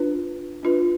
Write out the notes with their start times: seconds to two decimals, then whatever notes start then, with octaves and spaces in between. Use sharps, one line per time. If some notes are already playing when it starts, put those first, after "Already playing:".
Already playing: D4 F4 B4
0.63 D4 F4 B4